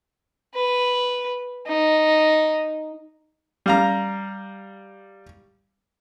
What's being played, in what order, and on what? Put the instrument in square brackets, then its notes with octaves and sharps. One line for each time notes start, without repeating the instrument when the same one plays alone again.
[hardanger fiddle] B4
D#4
[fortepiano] G3 F5 A#5